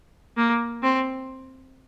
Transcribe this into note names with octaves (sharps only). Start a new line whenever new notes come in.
A#3
C4